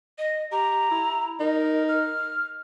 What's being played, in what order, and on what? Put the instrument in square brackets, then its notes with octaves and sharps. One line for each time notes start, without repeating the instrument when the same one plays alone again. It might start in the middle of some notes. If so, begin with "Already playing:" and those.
[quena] D#5
[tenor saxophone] G4 [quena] A#5
[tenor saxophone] E4
[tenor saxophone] D#4 [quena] A#4
[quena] F6